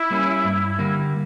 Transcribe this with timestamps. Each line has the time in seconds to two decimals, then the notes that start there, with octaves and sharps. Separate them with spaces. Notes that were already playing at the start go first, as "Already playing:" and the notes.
Already playing: E4
0.10 G3 A#3 C#4
0.44 G2
0.79 D3 G3 A#3